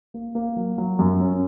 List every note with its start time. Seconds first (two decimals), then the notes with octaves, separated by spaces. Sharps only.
0.14 A#3
0.35 A#3
0.56 F#3
0.78 F#3
0.99 F#2
1.20 C#4